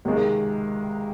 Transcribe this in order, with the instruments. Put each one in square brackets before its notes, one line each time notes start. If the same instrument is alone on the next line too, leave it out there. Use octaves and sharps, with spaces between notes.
[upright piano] C#2 C3 D#3 G#3